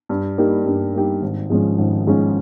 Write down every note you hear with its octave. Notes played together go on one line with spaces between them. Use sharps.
G2
G3 A#3 D#4 G4
G2
G3 A#3 D#4 G4
G#1
G#2 F3 G#3 C#4
G#1
G#2 F3 G#3 C#4